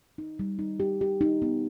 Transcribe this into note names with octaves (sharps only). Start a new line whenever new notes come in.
D#4
G3
D#4
G4
G4
D#4
B3